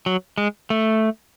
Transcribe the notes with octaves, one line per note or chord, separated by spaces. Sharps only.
F#3
G#3
A3